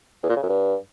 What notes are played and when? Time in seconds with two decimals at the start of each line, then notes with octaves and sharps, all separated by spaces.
0.23 E2
0.30 A#2
0.36 C#3
0.43 F#2
0.49 G2